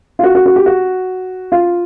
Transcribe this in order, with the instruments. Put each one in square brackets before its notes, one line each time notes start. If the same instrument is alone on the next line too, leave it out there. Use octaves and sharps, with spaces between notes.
[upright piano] F4
F#4
F#4
F#4
G4
F#4
F4